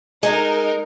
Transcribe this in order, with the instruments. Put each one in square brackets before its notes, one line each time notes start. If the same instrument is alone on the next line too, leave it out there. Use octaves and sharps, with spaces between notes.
[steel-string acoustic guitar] G#3 [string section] D#4 A#4